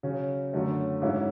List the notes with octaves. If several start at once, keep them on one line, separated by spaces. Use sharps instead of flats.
C#3 F#3 C#4
F#2 D3 F#3 A3 C#4
G#2 F#3 C#4 E4